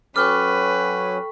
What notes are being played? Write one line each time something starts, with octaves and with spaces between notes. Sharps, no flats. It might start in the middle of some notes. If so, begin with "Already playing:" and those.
F#3 C#4 A4 B4 G5 C#6 D6 F6